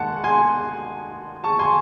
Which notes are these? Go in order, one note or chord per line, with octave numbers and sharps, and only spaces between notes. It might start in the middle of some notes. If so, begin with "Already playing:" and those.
Already playing: D#2 D#3 G#3 F#5 A5
G#5 C6
A5 C#6
G#5 C6